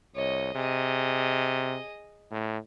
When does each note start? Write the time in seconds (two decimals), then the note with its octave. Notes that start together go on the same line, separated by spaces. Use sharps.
0.16 C2 C#5 D#5
0.55 C3 G#4 D#5
2.31 A2